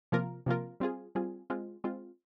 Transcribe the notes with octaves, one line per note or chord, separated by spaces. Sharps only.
C3 F3 A#3 F4 A#4
C3 F3 A#3 F4 A#4
G3 C4 F4 G#4
G3 C4 F4 G#4
G#3 C4 F4
G#3 C4 F4